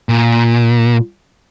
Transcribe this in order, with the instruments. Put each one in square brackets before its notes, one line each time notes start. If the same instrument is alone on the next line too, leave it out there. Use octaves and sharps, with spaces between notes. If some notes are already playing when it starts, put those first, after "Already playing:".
[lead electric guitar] A#2